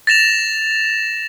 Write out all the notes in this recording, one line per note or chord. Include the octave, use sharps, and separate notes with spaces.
A6 A#6 E7 F7